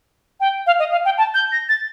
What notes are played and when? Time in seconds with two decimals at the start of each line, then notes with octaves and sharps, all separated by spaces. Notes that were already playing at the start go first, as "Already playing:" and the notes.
0.40 G5
0.67 F5
0.79 D#5
0.92 F5
1.05 G5
1.18 A5
1.34 G6
1.52 A#6
1.69 A6